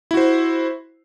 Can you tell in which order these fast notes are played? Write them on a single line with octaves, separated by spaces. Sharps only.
E4 F#4 C5